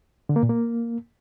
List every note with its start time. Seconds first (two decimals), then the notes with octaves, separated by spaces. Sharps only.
0.29 D3
0.36 A#3
0.43 A#2
0.49 A#3